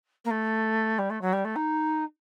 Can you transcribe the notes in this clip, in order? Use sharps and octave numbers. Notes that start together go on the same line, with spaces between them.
A#3
A3
G3
A3
F#3
G3
A3
D#4